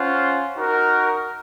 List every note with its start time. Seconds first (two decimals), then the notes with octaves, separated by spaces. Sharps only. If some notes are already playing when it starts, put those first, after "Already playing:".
Already playing: C#4 F4 C5 F#5
0.57 D#4 F#4 A#4